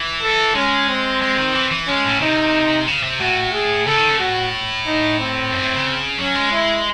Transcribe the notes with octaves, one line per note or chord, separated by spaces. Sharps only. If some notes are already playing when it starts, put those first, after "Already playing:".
Already playing: E3
A4
G#3 C#4
C4
G#3
D#3
E3
E3
G#3 C#4
A2
C3 D#4
C#3
C3
A2 F#4
G#4
C#3 A4
D#3
C#3
A2 F#4
D#4
C4
F#2
A2
C#3
F#3 C#4
G#3
E4